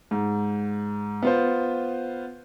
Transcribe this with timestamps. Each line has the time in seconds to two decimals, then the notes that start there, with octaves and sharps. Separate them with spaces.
0.11 G#2
1.23 B3 F4 C5